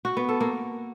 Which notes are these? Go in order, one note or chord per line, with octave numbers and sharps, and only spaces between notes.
F#4
B3
A4
A#3